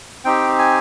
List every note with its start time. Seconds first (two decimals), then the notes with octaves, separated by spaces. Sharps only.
0.25 C4 D#4 G4 G5
0.59 G#5